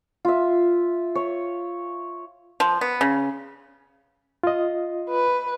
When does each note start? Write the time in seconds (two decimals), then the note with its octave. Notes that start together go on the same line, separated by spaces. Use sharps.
0.25 F4 E5
1.15 C#5
2.60 F3
2.81 B3
3.01 C#3
4.44 F4 D#5
5.10 B4